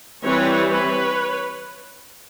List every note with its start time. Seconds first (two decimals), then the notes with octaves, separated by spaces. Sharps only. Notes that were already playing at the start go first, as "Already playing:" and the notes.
0.23 E3 G3 C4 B4 C#5
0.69 B4 C#5